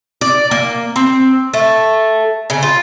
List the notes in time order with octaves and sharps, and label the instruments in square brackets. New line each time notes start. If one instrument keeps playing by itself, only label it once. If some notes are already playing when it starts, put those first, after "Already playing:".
[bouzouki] D5
A#3
C4
A3
C#3
F4